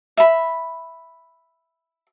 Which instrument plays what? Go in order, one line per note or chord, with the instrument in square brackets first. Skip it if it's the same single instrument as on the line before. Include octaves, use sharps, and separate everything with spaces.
[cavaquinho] E5 B5